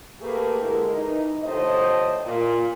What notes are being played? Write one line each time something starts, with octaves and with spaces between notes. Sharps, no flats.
A3 A#3 G4 G#4 A#4 B4
D3 G#3 E4 A#4
E3 D#4
F2 A2 D3 G4 C5 D#5
A#2